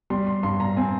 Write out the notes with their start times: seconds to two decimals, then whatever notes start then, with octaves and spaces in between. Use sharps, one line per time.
0.10 G3 C6
0.27 C6
0.43 G2 C6
0.60 A#5
0.77 C4 G#5